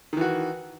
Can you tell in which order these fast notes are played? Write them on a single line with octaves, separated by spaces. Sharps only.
D#3 E3 F#4